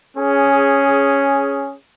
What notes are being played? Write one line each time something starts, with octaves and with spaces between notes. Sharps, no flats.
C#4 G#4